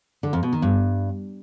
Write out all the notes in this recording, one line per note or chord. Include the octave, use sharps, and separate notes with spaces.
D3
F2
B2
D#3
G2